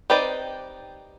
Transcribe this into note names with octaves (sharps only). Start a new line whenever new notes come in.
C4 D#4 G4 B4 D5